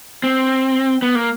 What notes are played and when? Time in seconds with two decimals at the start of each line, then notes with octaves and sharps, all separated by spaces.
0.23 C4
1.02 B3
1.15 A#3